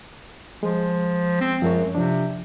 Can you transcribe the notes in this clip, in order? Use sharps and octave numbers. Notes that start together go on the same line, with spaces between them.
F3 G#3
C4
F#2 F3 G#3 C#5
C3 F3 D4